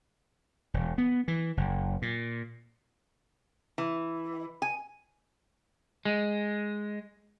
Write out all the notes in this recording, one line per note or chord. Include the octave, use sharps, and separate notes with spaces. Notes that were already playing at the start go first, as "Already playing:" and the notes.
E1
B3
E3
F#1
A#2
E3
G#5
G#3